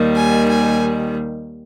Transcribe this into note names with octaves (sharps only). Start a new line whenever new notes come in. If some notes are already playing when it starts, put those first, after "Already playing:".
Already playing: D#2 D#3 G3
G#5
G#5